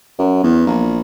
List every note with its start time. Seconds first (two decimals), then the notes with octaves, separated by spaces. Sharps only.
0.19 F#2
0.43 E2
0.67 A#1